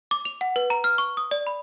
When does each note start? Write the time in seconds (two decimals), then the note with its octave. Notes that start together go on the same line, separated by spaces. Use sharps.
0.11 D6
0.25 F7
0.41 F#5
0.56 B4
0.70 A#5
0.84 F6
0.98 C#6
1.17 D#6
1.31 D5
1.47 B5